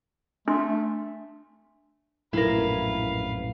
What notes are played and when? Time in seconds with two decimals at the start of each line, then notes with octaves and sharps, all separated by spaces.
0.48 A3 D4 C6
2.33 A#1 F#2 A2 E4 A#4 B4 F5